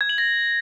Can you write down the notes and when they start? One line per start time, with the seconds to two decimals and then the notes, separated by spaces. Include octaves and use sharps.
0.01 G#6
0.09 F#7
0.18 A#6